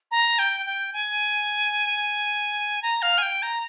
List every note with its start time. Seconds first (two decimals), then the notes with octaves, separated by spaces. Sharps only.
0.11 A#5
0.39 G5
0.66 G5
0.93 G#5
2.82 A#5
3.02 F5
3.18 G#5
3.22 G5
3.42 A#5